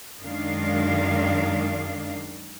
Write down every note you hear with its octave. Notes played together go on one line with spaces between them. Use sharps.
F#2 D#3 G#3 D4 F5